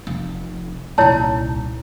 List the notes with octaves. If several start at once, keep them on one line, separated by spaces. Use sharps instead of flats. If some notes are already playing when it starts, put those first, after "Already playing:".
F1
D#1 C2 E4 C#5 A5